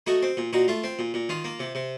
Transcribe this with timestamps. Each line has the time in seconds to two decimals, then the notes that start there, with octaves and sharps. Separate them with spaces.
0.07 A3 D#4 F#4
0.23 C4
0.37 A#2
0.53 A#2 D#4 F#4
0.68 A3 F4
0.84 C4
0.99 A#2
1.14 A#2
1.29 D#3 F4
1.44 A#3
1.60 C3
1.75 C3